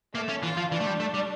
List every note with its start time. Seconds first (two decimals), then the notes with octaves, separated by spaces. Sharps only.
0.15 A3 A#3
0.29 C#4
0.43 E3 F4
0.57 F3
0.72 E3 D4
0.80 A3
0.86 G3
1.00 A3
1.14 G3